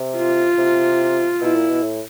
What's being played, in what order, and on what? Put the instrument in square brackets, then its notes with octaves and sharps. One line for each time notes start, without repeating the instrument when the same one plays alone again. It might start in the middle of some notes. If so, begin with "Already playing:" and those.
Already playing: [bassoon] C3
[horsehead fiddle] F4
[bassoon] C3
[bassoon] B2 [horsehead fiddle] E4
[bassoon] A#2
B2
A2